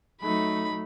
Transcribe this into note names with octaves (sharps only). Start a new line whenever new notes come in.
F#3 A3 D#4 B5